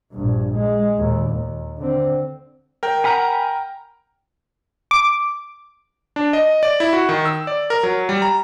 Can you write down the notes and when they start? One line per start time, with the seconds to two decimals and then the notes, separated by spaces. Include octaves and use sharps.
0.12 A#1 G2
0.56 G#3
0.98 D#2 A#2
1.31 D#2
1.78 D3 C4
2.83 A#4 G5
3.04 F#5 G#5 A#5 B5 F6
4.91 D6
6.16 D4
6.33 D#5
6.63 D5
6.80 E4
6.93 F#4
7.09 D#3
7.25 E6
7.47 D5
7.70 A#4
7.83 F#3
8.09 G3
8.22 A#5